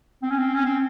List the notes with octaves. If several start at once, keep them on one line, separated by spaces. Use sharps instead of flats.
C4
C#4
C4
C#4
C4